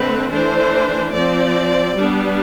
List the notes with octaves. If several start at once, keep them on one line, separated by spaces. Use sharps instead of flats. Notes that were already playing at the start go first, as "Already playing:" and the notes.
Already playing: D3 A3 C4 B4
E3 A3 D4 C5
F3 C4 D5
G3 B3 D4